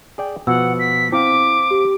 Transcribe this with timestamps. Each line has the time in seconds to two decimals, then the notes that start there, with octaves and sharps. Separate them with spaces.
0.18 G#4 D5 G5
0.47 B2 F3 F#5 E6
0.79 B6
1.12 C4 E4 F5 D6
1.71 G4